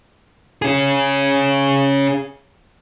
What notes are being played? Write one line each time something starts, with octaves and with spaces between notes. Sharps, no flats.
C#4 G#4